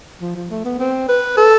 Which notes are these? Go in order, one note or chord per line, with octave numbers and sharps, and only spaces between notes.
F3
F3
A3
B3
C4
B4
A4